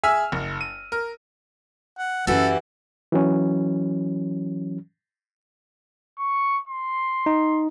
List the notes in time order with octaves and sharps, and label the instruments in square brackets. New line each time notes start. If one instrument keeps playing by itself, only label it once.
[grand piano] G#4 E5 G#5 E6 F6
F#1
D#7
A#4
[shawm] F#5
[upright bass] F#2 C#4 [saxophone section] E3 [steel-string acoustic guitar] F#4 G4 [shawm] A4
[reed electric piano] E3 F#3 C#4
[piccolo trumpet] C#6
C6
[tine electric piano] D#4